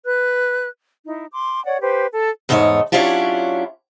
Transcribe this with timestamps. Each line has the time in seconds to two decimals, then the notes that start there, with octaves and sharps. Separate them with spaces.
0.05 B4 F#6
1.06 D#4 E4
1.31 C6 D6
1.65 C#5 D5 F#5
1.81 G4 B4 C5
2.12 A4 A5
2.49 E2 G#2 A3 D#4 C#5
2.92 F#3 C#4 D4 E4 F4 G4